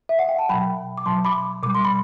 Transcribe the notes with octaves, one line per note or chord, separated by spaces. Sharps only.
E5
F#5
G5
A5
B2 F#3 G5 B5
D6
B2 F#3 A5 C6
B5 D6
B2 G3 D6
C6
B5